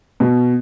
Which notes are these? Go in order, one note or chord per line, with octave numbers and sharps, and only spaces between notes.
B2